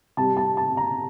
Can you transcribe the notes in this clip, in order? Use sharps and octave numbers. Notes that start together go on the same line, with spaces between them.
C3 G3 A5
A5
A5
A#5